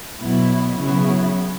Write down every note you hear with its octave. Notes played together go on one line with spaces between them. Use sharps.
B2 F#3 B3 E4
C#3 F#3 B3 E4